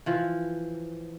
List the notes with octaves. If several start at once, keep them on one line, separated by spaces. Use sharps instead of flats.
E3 F3